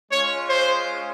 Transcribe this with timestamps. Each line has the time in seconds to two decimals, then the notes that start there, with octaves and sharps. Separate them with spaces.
0.11 G#3 C#4 F4 C#5
0.49 C5